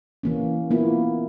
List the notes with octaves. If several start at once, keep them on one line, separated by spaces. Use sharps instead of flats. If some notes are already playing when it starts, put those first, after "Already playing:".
E3 A#3 C#4
A#3 B3 E4 F4